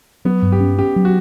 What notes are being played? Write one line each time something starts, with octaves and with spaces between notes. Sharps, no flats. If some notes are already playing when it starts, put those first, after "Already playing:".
F#3 B3
G2
G4
C#4
C#4 G4
F#3
F#4